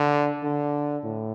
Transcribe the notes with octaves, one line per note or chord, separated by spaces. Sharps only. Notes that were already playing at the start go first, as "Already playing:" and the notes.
Already playing: D3
D3
A2